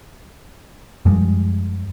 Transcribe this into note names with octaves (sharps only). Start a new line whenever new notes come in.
F#2 F3 G3 G#3